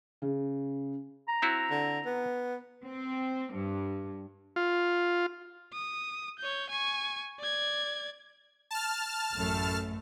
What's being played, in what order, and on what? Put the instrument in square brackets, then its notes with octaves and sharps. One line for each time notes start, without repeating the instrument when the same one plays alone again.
[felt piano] C#3
[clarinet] A#5
[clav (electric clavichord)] C4 E4 F#4
[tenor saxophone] D3
B3
[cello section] C4
G2
[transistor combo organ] F4
[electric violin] D#6
C#5 G6
G#5 C#6
D5 G#6
[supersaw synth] A5 F6
[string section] A1 F#2 A3